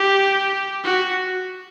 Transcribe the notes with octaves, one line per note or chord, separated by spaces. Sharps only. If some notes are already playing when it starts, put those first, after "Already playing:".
Already playing: G4
F#4